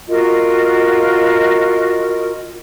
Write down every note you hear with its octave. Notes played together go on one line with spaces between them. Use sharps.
F4 F#4 A#4 D#5